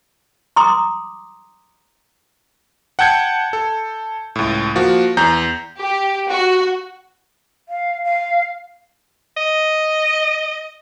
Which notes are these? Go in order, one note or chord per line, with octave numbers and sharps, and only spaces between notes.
A#5 C6 D6 D#6
F#5 G5 A5 G6 G#6 C#7
A4
C#2 A2
F3 A#3 F#4
E2 A#5 G6
G4
F#4
F5
F5
D#5